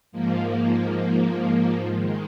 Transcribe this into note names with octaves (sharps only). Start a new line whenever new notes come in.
G#2 F3 A#3
D#3 G#3